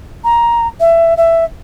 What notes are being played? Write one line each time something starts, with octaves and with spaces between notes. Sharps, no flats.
A#5
E5
E5